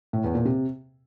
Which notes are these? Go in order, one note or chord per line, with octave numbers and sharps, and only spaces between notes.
A2
E2
A#2
C3